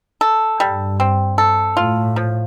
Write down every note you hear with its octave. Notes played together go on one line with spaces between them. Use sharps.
A4
G2 G3
C4
A4
A2 F4
F3